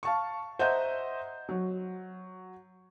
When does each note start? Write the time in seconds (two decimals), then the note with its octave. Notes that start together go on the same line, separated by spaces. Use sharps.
0.03 F5 A5 C#6
0.59 C5 D#5 E5 F#5 A#5 G6
1.49 F#3